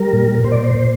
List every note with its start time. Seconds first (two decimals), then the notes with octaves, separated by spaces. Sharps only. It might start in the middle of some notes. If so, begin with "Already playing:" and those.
Already playing: G3 A#4
0.13 A#2
0.44 A#2 C5
0.52 D5
0.58 C5
0.75 A#2